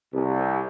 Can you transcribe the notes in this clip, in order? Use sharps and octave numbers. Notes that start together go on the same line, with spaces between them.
C2